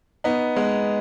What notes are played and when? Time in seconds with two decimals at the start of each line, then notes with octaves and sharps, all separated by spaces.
0.24 B3 D#4
0.56 G#3 B3